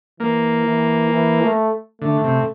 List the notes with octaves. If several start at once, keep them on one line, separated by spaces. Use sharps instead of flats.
E3 A#3
E3
E3
A3
D3 A3
C3